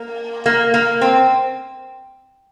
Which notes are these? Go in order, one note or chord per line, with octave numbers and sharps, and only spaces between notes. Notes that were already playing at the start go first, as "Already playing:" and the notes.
Already playing: A#3
A#3
A#3
C4